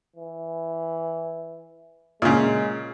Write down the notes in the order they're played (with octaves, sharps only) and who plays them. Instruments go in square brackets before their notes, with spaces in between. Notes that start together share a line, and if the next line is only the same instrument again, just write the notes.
[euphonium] E3
[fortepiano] A#2 C#3 [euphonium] G#3